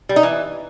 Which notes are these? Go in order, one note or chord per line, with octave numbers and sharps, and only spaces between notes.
G3
D#4
E3